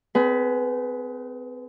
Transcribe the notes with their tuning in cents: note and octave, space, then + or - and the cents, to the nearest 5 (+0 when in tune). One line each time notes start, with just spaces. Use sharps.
C4 -35 G#4 +25 B4 +0